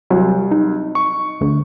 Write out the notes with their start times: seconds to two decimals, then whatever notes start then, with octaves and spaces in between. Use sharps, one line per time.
0.10 C2 F#3
0.51 D#4
0.95 C#6
1.41 D2